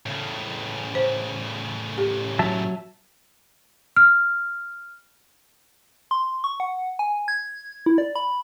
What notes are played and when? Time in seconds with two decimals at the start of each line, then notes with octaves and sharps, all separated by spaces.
0.06 A2 C#3
0.95 C5
1.98 G4
2.39 F#3 E5 A5
3.97 F6
6.11 C6
6.44 C#6
6.60 F#5
6.99 G#5
7.28 G#6
7.86 E4
7.98 D5
8.15 B5